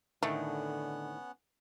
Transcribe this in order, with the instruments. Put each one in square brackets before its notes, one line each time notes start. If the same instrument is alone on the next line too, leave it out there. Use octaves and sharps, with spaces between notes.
[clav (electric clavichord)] A2 D#3 [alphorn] D3 [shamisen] A3 [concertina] B3 C#4 F#5